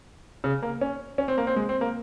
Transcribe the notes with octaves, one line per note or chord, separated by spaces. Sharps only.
C#3
A#3
C#4
C#4
C4
A#3
C4
G#3
C4
A#3